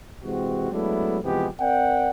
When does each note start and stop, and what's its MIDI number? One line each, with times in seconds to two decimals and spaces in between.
0.22 0.68 48
0.22 0.68 52
0.22 0.68 56
0.22 0.68 60
0.22 0.68 66
0.71 1.17 54
0.71 1.17 56
0.71 1.17 57
0.71 1.17 59
0.71 1.17 62
0.71 1.17 64
1.23 1.47 48
1.23 1.47 52
1.23 1.47 53
1.23 1.47 56
1.23 1.47 59
1.23 1.47 67
1.60 2.10 60
1.60 2.10 70
1.60 2.10 74
1.60 2.10 78
1.60 2.10 79